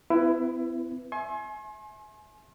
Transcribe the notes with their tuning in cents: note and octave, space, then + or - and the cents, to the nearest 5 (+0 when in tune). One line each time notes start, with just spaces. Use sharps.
C4 -45 E4 +20 B4 +0
E5 +0 G#5 +30 C6 +40